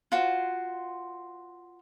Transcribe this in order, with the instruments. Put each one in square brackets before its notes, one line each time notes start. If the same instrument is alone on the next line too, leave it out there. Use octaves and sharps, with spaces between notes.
[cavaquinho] F4 F#4 C5